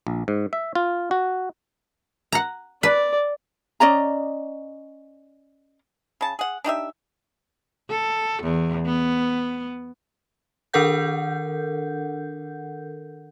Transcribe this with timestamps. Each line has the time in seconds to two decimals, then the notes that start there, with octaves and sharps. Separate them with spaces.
0.07 A#1
0.28 G#2
0.53 E5
0.75 F4
1.11 F#4
2.32 F#5 A#5
2.83 B4 D5
3.80 C#4 D5 D#5 A#5
6.21 C#3 A5
6.39 G#4 F#5
6.64 D4 D#4 G4 E5
7.90 A4
8.43 E2
8.86 B3
10.73 D#3 D4 A4 A#4 F#5 G6